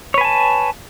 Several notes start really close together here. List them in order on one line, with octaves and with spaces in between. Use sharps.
C#5 B4 G#5 A5